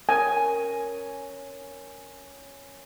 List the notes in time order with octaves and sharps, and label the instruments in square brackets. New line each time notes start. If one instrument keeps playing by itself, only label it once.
[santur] C#4 A#4 [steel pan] G#5